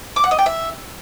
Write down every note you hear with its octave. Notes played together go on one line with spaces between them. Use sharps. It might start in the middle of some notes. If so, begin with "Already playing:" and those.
D6
F#5
D#5
G5
E5